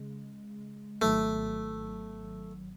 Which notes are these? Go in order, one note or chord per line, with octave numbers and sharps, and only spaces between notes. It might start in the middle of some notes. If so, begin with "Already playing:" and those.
Already playing: C#3 G#3
G#1 G#2 D#3 F#3 A3 B3